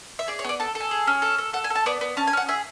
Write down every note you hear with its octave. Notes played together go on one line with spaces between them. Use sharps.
E5
G#4 D5
C#5
B3 D5
A4 A5
A4
G#5
G#4
C#4
A4
A4
A4 F#5
G#5
A4
A5
B3 D5
B3
C#4 A5
G#5
C#4 F#5
G#4 E5